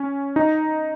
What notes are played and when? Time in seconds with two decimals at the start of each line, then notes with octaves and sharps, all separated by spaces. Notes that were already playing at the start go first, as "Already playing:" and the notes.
Already playing: C#4
0.36 D#4